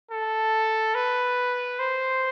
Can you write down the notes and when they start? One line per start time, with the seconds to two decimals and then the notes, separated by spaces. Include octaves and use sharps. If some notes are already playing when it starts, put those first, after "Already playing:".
0.11 A4
0.95 B4
1.79 C5